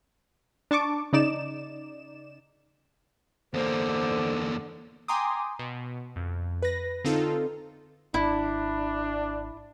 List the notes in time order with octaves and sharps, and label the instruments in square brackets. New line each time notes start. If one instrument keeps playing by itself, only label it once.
[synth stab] D4 A5 C#6 D6
C#3 D#4 D5 E7
[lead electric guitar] E2 A#3 [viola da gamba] D3 [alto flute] C5
[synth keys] G5 G#5 A#5 C6 D6 D#6
B2
F2
B4 A#6
D3 C4 D#4 F4 A4
[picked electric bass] G#1 [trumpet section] D4 [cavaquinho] E4